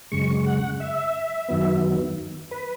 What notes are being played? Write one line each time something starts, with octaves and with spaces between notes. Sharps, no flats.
F#2 C#3 G#3 C#6
F#5
E5
F#2 D#3 F#3 B3
B4